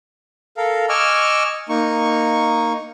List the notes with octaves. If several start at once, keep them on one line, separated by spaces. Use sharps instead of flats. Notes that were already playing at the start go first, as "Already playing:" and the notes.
A4 A#4 F5
D#5 G#5 C#6 D6 E6 F6
A#3 D#4 C#6